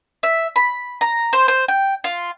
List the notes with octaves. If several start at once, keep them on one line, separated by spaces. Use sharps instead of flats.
E5
B5
A#5
C5
C5
G5
F4